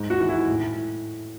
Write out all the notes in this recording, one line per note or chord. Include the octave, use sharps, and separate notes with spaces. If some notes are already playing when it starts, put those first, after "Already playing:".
Already playing: G#2
F#4
E3
E4
A2